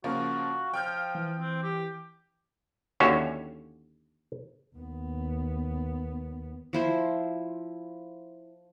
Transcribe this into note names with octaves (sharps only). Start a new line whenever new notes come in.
C#3 F3 A#3 F#4 F5
F3 G5 F6 G6
E3
C4
G4
D#2 D3 C#4 F#4 C#5 E5
D#2 B3
F3 E4 C5